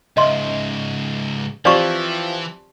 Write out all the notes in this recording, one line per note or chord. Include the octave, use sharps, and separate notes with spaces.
C#2 G#2 D#5 E5 C6
E3 F3 C4 G4 D5 C#6